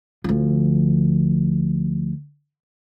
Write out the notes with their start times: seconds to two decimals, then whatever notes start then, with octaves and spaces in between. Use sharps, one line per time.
0.24 D2 F3